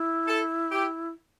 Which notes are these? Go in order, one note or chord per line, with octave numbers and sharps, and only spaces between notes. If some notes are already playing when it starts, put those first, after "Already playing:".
Already playing: E4
A4
G4